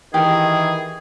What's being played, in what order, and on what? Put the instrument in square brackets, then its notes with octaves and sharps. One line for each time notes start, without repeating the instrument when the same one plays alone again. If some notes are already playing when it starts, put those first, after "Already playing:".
[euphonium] D#3 [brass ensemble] E3 [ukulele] G4 [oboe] G#4